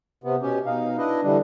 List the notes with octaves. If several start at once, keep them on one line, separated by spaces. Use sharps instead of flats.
C3 B3
B2 C#4 G4
B2 D#4 F5
D4 E4 B4 D#5
D3 E3 G3 D4